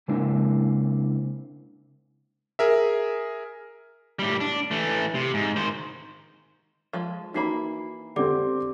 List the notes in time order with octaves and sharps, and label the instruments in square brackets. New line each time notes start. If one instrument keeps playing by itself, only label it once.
[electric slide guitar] C#3 G#3 A#3 C4 D4 E4
[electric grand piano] G#4 A#4 E5
[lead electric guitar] A2 G3
D4
E3 A3
C3
G#2
D#3 C5
[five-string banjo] F3 G#3
[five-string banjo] E3 A#3 B5 [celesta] D#4 F#4 C7
[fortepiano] D3 C4 [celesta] G4 D5 D6